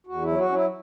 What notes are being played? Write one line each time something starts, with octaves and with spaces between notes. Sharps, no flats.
E2 F#4
E4
F#3
F#4
F#3 C#4
E4